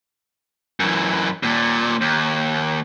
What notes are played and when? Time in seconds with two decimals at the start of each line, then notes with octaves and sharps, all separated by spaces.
0.80 F#2 E3
1.43 D#2 A#2
2.01 D#2